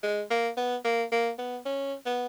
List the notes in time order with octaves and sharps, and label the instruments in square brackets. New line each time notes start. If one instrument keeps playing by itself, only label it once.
[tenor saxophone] G#3
A#3
B3
A#3
A#3
B3
C#4
B3